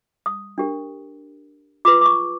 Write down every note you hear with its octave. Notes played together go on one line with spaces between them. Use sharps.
D#6
D4 G4 A#4
F4 G#4 B4 D6
D6
C#6